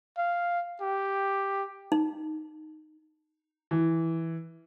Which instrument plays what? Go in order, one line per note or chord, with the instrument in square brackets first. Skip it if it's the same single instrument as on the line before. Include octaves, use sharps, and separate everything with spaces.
[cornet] F5
G4
[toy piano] D#4
[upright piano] E3